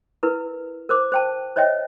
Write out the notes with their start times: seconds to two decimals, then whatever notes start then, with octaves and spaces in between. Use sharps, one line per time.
0.23 E4 A#4 B4
0.89 A#4 C5 D6
1.12 C5 G5 A5
1.56 C5 C#5 D#5 E5 G5